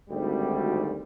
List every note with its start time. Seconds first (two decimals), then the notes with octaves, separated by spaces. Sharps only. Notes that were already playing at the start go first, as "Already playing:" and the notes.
0.10 G#1 D2 G3